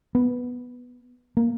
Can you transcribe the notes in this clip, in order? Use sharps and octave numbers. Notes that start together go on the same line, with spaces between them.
B3
A#3